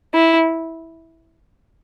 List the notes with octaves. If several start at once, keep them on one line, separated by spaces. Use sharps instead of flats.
E4